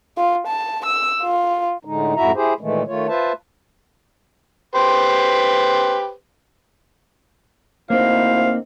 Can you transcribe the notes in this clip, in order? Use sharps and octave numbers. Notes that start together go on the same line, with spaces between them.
F4
A5
E6
F4
A2 D3 G#3 D#4
F2 G#2 E4 F#4 E5 A#5
E4 G4 G#4 C5
A#2 D#3 E3 G#3 A3
D#3 A3 F4 C#5
F4 B4 C5 E5 A5
G4 B4 C5
D2 A#3 C4 D#4 E4 C5 F5